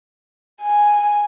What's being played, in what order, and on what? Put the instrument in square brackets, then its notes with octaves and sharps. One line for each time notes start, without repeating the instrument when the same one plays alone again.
[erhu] G#5